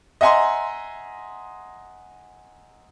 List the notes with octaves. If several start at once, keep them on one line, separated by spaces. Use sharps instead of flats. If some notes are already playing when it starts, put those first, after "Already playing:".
D#5 E5 F#5 G#5 A#5 C6